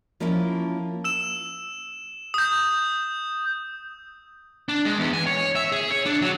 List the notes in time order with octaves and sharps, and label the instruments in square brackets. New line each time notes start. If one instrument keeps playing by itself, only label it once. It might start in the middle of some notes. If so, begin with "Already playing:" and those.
[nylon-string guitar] F3 A#3 C#4 E4 F4
[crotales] E6 E7
D#6 G6
[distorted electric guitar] D4
G#3
E2
G#5
C#5
E5
G#4
C#5
D4
F#3